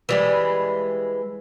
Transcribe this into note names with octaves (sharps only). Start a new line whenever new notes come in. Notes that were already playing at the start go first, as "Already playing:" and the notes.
E3 G3 G#3